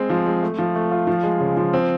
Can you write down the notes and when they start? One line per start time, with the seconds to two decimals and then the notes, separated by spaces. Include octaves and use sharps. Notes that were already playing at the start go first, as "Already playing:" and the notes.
Already playing: G#3 C4
0.10 F3
0.26 G#3
0.42 A3
0.58 F3
0.75 A3
0.92 F4
1.07 F3
1.23 G#3
1.40 C#3
1.57 F3
1.73 C4